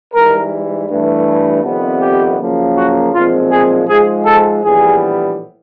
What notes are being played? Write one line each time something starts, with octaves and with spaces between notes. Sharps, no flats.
G#2 E3 G3 A#4
G2 E3 A3
F2 C3 D#3 G3 B3
G4
F#2 C#3 F3 A#3
F#4
B1 A#2 F3 G#3 C4 F4
G#4
G#2 F3 G#3 G#4
A4
A#1 A2 E3 G3 B3 G#4